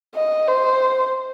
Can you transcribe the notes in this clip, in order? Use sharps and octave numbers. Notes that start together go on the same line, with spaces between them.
D#5
C5